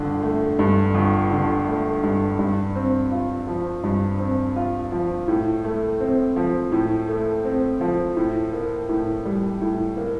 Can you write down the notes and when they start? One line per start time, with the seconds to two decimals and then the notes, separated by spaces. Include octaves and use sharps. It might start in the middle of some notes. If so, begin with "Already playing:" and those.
Already playing: G1 D3
0.23 A3
0.59 G2
0.94 G1
1.31 D3
1.67 A3
2.03 G2
2.39 G2
2.75 C4
3.11 F4
3.47 F3
3.83 G2
4.19 C4
4.56 F4
4.92 F3
5.28 A2
5.64 A3
6.00 C4
6.36 F3
6.72 A2
7.08 A3
7.45 C4
7.81 F3
8.17 A2
8.53 A#3
8.89 A2
9.25 G3
9.61 A2
9.97 A#3